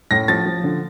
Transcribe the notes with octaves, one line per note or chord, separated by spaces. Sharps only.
A2 A#6
F3 A6
F3
D3